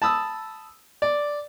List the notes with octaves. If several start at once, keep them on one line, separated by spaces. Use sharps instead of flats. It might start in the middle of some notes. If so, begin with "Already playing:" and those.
A5 B5 D#6 E6
D5